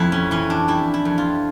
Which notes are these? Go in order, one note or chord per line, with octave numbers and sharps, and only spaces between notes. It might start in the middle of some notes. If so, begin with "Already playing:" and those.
Already playing: F2 E4
C#4
E3 C#4
D4
G3 E4
E4
F2
F4